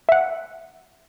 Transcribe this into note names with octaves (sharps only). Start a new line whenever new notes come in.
E5 F#5